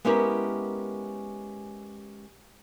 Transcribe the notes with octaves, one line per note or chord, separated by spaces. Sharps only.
G#3 B3 C#4 E4 G4 A#4